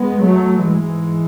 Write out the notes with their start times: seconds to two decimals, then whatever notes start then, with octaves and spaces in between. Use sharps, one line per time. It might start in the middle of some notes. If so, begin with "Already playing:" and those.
Already playing: G#3 B3
0.23 F#3 A3
0.65 G#2 E3 G#3